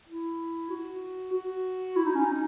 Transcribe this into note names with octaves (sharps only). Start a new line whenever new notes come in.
E4
F#4
F#4
E4
D#4
C#4
D#4